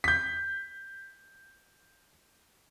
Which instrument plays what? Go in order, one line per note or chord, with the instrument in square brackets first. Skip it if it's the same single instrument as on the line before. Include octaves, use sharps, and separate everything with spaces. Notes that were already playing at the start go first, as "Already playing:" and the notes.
[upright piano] G6 B6